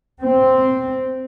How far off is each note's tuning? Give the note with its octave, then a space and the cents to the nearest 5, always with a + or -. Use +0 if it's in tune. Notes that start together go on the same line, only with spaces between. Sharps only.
C4 -5